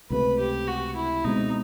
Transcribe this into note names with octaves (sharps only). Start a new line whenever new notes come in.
C#2 C3 F3 A3 B4
G4
F#4
E4
B2 G#3 C4 D#4